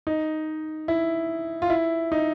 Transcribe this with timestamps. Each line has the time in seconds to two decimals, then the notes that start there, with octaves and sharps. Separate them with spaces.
0.07 D#4
0.88 E4
1.62 F4
1.70 E4
2.12 D#4